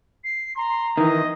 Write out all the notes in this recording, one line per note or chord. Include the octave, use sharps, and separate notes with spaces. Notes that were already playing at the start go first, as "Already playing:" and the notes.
C7
A#5 C6
D#3 E3 D#5